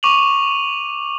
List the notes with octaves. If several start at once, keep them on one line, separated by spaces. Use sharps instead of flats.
C#6 D6 D#7 F7 F#7